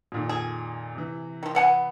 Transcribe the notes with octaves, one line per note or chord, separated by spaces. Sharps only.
F2 A#2 D#3
G#4
C3 E3
D#3 F3
B3 F#5 G#5